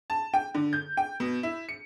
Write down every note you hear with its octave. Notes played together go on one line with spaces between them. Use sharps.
A5
G5
D3
G6
G5
B2
E4
C#7